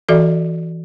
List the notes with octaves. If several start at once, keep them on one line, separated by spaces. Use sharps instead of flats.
E3 F#4 A4 D5 E5